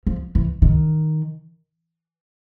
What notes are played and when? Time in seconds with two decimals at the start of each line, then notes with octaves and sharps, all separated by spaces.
0.07 F3
0.35 E3
0.62 D#3